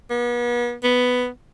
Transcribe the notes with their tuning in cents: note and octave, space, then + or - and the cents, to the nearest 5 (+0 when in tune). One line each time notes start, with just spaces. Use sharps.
B3 -40
B3 +5